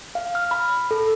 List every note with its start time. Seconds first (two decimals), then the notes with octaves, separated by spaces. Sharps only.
0.15 F5
0.35 F6
0.51 B5
0.91 A4